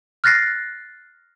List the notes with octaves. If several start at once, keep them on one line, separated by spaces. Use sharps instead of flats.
F6 F#6 A6 A#6 C7